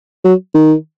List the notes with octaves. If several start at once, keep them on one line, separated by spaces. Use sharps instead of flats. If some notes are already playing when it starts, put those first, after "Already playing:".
F#3
D#3